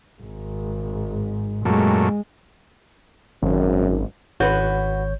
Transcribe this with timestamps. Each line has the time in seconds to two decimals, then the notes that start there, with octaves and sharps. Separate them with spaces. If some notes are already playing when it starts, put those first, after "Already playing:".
0.22 G#1 G#2
1.65 F#2 A#2 G#3 A3
3.43 G#1 F#2
4.40 G#1 F#4 B4 C#5 G6